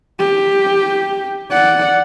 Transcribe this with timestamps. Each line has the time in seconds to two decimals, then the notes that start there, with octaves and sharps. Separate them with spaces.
0.19 G4
1.51 D5 F#5